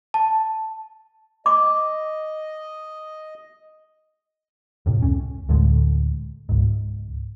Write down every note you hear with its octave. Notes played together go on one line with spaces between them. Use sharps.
A5
D#5 D6
F2 A2 C3
C#2 C#4
D2 A2 D3 G#3
C#2 G#2